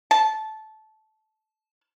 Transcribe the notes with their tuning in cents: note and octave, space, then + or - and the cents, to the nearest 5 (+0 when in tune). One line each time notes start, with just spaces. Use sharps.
A5 -15